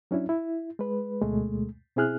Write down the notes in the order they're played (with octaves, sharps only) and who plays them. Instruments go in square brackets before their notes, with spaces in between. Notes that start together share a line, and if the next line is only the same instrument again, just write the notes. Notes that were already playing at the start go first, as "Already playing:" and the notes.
[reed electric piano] F#3 C#4 D4 E4
E4
G#3 B4
D2 B2 G#3 A3
B2 C4 E4 G#4 F6 F#6